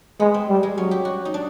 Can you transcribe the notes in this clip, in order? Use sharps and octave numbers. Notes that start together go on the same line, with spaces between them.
G#3 B3
C4
G3
G#3
F#3 C#4
G4
F#4
D#4
D4